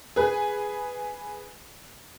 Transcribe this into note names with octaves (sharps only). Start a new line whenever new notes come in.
G#4 B4